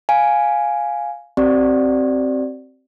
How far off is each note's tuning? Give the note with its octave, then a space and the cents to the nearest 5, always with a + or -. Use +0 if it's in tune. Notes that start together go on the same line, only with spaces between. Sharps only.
F5 +0 G#5 +0
C4 +5 G4 -45 D5 +0